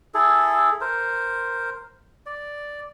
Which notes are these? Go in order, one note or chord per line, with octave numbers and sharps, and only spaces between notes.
E4 G#4 A4
A#4 C5
D5